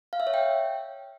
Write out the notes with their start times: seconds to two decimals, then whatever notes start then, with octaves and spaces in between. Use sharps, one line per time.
0.13 F5
0.20 E5
0.27 C#5
0.34 G5